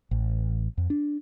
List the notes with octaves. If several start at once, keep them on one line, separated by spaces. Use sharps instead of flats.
A1
F2
D4